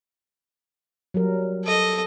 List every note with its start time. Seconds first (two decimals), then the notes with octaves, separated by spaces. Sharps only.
1.14 F#3 G3 A#4
1.64 A4 D#5